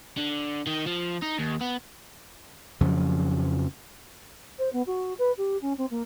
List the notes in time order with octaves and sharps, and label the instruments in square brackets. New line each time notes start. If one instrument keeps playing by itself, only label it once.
[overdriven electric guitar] D3
D#3
F3
D#4
D#2
B3
[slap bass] F2 C#3 F3 F#3
[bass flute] C5
B3
F#4
B4
G4
C#4
C4
A#3